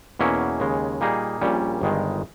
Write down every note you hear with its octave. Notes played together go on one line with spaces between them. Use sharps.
E2 B2 A#3 C#4 E4
D#2 C#3 G#3
A#2 G3 A#3 D#4 G#4
A#1 A#2 G3 C#4
G1 G2 D#3 G#3